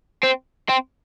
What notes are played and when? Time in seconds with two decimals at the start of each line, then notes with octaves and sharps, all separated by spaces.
0.23 C4
0.69 C4